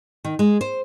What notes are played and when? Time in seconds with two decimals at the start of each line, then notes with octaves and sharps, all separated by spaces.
0.24 D#3
0.39 G#3
0.61 C5